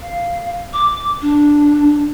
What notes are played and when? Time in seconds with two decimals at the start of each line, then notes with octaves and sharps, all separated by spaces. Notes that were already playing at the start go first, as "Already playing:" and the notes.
0.01 F5
0.73 D6
1.22 D4